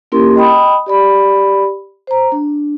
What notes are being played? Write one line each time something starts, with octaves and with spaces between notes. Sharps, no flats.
A#3 C#4 E4 G4 A#4 C6
D#5 G5 B5 D#6
G4 D5 B5
C5 A#5
D4